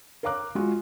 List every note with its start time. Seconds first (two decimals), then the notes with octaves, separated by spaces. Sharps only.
0.23 A#4 C#5 F5 A#5 D6 F#6
0.55 G#3 F4 F#4